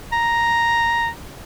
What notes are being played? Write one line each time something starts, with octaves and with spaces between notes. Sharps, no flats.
A#5